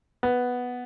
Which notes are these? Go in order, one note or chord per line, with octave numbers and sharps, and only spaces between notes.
B3